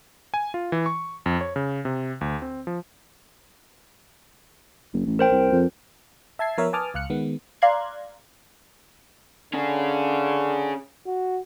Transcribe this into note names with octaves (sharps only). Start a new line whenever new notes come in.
G#5
F4
E3
C#6
F2
C#5
C#3
C3
D2
C4
F3
F#1
A1
A#4 C5 G5
C2
F2
E5 A5 G#6 C7
F3 B3 A#4 C#5 E5
B4 G#5 A5 D6 D#6 F6
C#2 F5 F6 F#6 C#7
D#3 G#3 B3
D5 F5 A#5 C6 F#6 G#6
D3 C#4 G#4
F#4